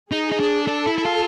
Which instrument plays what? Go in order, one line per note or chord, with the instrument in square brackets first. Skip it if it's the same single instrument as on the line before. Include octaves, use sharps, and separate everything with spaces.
[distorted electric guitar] D#4 [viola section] G#4
[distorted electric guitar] D#4
D4
[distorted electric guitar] D4 [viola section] A4
[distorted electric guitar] E4
E4
F4